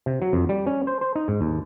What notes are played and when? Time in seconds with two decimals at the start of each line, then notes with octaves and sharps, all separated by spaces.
0.06 C3
0.22 F#3
0.33 F2
0.49 G3
0.67 C#4
0.87 C5
1.01 C5
1.15 D#4
1.28 G#2
1.41 D#2